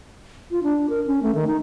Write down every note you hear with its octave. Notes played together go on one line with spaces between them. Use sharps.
F4
D4
A#4
C#4
A3
D#3
D#4